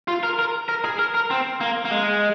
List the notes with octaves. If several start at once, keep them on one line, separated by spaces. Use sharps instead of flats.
F4
A#4
A#4
A#4
G#4
A#4
A#4
C4
A#3
A#3
G#3